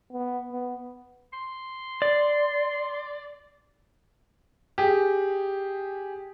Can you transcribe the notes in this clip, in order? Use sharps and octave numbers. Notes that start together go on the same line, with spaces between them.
B3
B3
C6
D5
G4 G#4